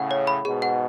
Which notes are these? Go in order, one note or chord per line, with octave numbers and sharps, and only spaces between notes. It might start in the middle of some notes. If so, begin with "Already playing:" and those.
Already playing: A2 C#3 F#5
C#5
B5
G#2 B2 G#4
F#5